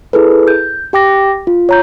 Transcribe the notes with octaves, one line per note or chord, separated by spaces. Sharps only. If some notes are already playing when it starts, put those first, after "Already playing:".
E4 G#4 A4 B4
G6
G4 G5 D6 A#6
F4
C#5 A#5 G6